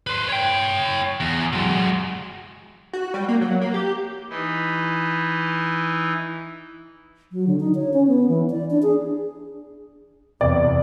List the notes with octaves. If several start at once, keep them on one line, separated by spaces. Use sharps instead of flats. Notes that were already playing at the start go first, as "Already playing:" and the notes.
B4 C5
C#5 G5
E2
F#3 G#3
F#4
G3
A#3
F#3
A#3
G4
E3 D#4 E4
F#3
D3
D#4
C#5
C#4
B3
E3
D5
D4
G#4
E2 C3 D5